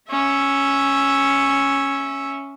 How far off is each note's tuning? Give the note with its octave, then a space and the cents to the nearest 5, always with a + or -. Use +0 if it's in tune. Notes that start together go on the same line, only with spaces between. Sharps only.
C#4 +0 E5 +0